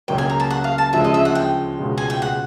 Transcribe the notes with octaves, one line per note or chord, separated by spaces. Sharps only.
C#2 C#3 F#3 A#3 G5
G#5
A#5
A5
F#5
F5
A5
D2 C#3 F3 G#3 E5
D#5
E5
F#5
G5
C#2 B2 G#3 C#4 F4
G#5
G5
F#5